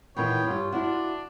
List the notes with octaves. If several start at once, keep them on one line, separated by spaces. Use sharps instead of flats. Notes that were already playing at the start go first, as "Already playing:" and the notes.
E2 A#2 D#3 B3 C#5 G5
G2 F4 G4
D4 E4 F#4